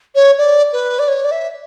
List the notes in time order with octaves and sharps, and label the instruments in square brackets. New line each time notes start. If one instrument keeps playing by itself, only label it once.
[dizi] C#5
D5
B4
D5
C#5
D5
E5